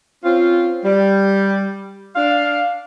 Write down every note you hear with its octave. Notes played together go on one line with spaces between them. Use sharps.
C4 C#4 F4
G3
D4 F5